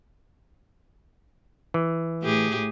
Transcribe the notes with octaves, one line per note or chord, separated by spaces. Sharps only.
E3
A2 G4 G#4